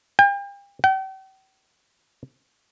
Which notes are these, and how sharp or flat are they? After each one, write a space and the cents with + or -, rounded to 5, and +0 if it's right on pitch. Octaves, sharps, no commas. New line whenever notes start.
G5 +40
G5 -40